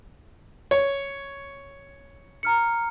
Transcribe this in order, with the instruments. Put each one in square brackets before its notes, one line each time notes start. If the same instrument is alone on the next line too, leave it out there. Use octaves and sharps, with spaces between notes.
[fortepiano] C#5
[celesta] A#5 F6 C#7